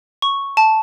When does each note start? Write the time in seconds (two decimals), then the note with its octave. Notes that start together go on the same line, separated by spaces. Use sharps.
0.22 C#6
0.57 A5